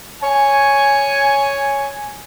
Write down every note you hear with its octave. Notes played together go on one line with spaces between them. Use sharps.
C#5 G#5